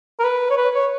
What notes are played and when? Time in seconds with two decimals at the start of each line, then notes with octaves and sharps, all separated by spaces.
0.20 A#4
0.24 B4
0.50 C#5
0.57 B4
0.74 C#5